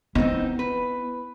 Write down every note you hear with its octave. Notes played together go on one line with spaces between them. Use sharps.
B3 C4 D#4 E4
B4